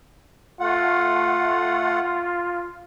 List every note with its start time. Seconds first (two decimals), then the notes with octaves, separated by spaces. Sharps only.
0.60 A3 F4 F#5